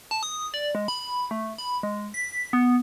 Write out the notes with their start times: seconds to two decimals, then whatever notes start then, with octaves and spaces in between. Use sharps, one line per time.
0.11 A5
0.23 D#6
0.54 D5
0.75 G#3
0.88 B5
1.31 A3
1.58 B5
1.83 G#3
2.14 B6
2.53 B3